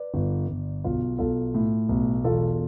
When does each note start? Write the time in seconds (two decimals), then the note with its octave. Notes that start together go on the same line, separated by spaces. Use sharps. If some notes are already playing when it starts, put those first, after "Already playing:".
Already playing: B4 D5
0.14 G1
0.48 G1
0.84 B1 F4
1.18 B1 F4 A4
1.55 A2
1.89 B1
2.24 E1 F4 A4